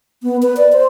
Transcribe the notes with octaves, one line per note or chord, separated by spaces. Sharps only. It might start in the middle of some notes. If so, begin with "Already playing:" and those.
B3
B4
D5
C5